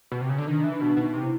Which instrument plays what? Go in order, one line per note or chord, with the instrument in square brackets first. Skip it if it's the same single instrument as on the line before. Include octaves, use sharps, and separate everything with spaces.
[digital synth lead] B2
C3
C#3
D3
[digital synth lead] D#3 [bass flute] D4
[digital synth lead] E3
[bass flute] D4
[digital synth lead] B2
[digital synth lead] B2 [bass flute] D#4
[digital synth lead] C3
[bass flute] E4